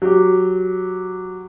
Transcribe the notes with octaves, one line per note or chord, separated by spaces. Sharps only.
F#3 G4